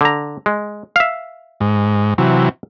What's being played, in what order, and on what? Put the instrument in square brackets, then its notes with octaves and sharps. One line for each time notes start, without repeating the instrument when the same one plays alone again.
[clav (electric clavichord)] D3 A#5
G#3
E5 F5
[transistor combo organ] G#2
C3 E3 F#3